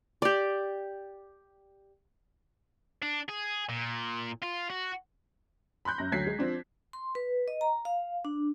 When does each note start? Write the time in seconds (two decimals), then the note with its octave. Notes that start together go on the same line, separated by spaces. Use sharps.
0.22 G4 D5
3.02 D4
3.29 G#4
3.69 A#2
4.43 F4
4.70 F#4
5.85 B5 C6 F#6 G6
5.98 F#2 A#6
6.12 D2 F#3 G#6 B6 C7
6.27 G#3
6.39 F3 C4 D4
6.93 C6
7.15 B4
7.48 D#5
7.61 A#5
7.85 F5
8.25 D4